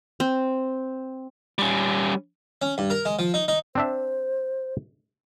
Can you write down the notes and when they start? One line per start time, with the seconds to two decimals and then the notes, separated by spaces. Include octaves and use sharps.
0.20 C4
1.58 G3 C#4
2.62 C#4
2.78 G2
2.90 A#4
3.05 G#3
3.19 F3
3.34 D#4
3.48 D#4
3.75 C4 D4 C5 E5